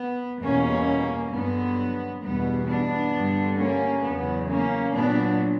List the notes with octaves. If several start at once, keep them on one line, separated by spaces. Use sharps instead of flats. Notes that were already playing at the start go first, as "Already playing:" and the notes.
Already playing: B3
E2 B2 G3 A#3 C#4
G2 D3 F#3 B3
E2 B2 G3 B3
B3 D4
G2 D3 G3
A#3 C#4
E2 C#3 F#3 B3
A#3 C#4
A#2 F#3 B3 D4